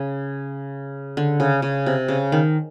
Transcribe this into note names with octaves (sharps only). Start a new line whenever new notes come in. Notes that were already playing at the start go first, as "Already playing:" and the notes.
Already playing: C#3
D3
C#3
C#3
C3
C#3
D#3